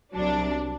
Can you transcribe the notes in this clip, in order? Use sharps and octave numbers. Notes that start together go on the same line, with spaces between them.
C2 C3 F#3 D4